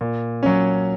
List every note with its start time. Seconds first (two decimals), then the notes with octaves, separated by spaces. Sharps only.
0.01 A#2
0.43 F#3 C#4